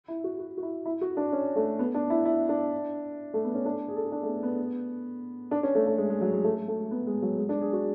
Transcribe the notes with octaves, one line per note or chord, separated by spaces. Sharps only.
E4
F#4
F#4
F#4
E4
E4
F#4
D4
C#4
A3
B3
D4
E4
E4
D4
A3
B3
C#4
D4
G#4
A4
G#4
D4
A3
B3
B3
D4
C#4
A3
A3
G#3
G#3
F#3
G#3
A3
A3
B3
G#3
F#3
G#3
D4
G#4
F#4